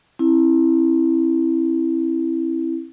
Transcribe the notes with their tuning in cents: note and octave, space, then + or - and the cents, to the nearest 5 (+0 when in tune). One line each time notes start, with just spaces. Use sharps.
C4 +35 E4 +0